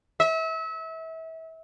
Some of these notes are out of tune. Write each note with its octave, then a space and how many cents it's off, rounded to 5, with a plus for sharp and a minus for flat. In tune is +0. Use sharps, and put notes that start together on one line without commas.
E5 -30